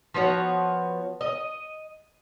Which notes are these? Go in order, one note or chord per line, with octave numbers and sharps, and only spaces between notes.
F3 B3 F#4 C#5
D#5